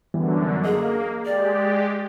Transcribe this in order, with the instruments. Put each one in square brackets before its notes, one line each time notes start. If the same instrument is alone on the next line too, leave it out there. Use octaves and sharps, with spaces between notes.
[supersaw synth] F#2 D3 [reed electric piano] E3 G3 B3
[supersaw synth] A#3 [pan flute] G#4 [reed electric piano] D#5
[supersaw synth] G#3 G4 [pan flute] D5